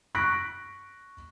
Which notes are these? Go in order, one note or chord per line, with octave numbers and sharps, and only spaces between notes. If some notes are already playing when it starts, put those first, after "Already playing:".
C#6 F#6 A#6 B6 D7